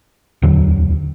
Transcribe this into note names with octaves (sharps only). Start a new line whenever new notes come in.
D1 E2 D3 F#3